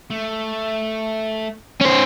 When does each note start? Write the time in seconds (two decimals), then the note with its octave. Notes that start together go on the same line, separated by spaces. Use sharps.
0.10 A3
1.81 C#4 C5